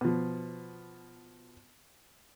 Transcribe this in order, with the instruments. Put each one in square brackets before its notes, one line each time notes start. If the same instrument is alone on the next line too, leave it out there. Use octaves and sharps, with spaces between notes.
[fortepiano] B2 F3